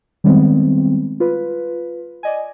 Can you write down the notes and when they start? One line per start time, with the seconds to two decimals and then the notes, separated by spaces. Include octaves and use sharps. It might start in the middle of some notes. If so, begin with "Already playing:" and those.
0.24 D#3 G3 G#3 B3 C4
1.20 F4 B4
2.23 D5 D#5 G#5